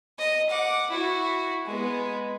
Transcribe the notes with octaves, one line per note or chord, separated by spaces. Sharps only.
D#5
F#5 D6
E4 F#4
G#3 B3